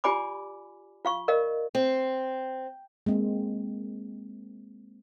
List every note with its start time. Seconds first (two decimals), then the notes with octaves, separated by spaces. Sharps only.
0.04 F4 G4 D5 G#5 B5 D6
1.05 F4 F5 C#6
1.28 A#4 D5 D#5 F5
1.75 C4
3.06 G#3 A#3 C4